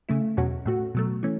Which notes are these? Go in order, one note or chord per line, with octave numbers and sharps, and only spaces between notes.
C#3 A3 E4
E2 B2 F#3 C#4 F#4
A2 A3 F#4
B2 F#3 A3
E3 A3 C#4